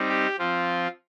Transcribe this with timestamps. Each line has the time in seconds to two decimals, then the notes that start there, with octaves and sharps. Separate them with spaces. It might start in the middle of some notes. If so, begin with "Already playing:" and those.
Already playing: G3 C4 D#4
0.09 G4
0.38 F3 C4 F4